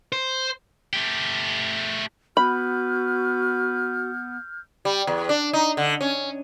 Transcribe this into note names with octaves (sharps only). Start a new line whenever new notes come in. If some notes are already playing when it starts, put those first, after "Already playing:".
C5
A3 G4
B3 F#4 B5 F6 G6
G3
E2
D4
D#4
D3
C#4